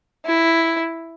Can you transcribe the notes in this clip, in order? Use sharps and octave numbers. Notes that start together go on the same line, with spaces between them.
E4